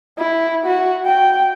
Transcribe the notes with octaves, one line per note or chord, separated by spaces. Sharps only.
E4
F#4
G5